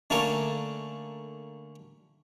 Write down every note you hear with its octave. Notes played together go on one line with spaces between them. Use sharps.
D3 A3 A#3 C#4 A4 A#4